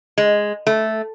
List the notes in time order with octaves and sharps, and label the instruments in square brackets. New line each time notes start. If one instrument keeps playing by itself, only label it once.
[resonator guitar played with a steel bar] G#3
A3